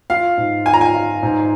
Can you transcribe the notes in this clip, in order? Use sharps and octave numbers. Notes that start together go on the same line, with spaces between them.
F4 F5
G#2
F4 G#5
A#5
G#5
F4
G#2